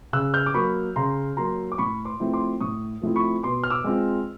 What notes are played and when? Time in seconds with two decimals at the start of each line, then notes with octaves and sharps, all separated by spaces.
0.13 C#3 E6 F#6
0.34 F6 G6
0.46 D6
0.54 F#3 A#3 B5 C#6
0.96 C#3 A#5 C6
1.37 F#3 A#3 A#5 C6
1.72 D6
1.78 A2 B5 C#6
2.05 C6 D6
2.20 F3 A3 C4 E4
2.33 C6 D6
2.61 A2 C#6 D#6
3.02 F3 A3 C4 E4
3.16 B5 C#6
3.43 B2 C6 D6
3.64 F6
3.70 D6 E6
3.84 G#3 C4 F4